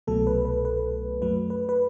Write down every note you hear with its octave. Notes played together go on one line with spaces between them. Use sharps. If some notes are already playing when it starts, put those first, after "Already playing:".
C2 B2 F#3 A3 A4
B4
B4
B4
F#2 F#3 A3 B4
B4
B4